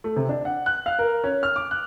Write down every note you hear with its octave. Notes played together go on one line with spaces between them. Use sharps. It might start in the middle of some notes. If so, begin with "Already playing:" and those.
A3
C3
D4
F#5
F#6
F5
A#4
C#4
F6
D6
F#6